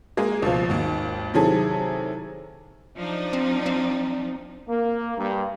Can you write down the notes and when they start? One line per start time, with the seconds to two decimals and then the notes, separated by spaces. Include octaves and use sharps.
0.17 G#3 A#3 G#4
0.42 C#2 B2 F3
0.70 G#1 D#2
1.34 C3 D#3 F#3 E4 G#4 A4
2.98 F3 D4 D#4
3.33 C4
3.66 C4
4.68 A#3
5.17 G2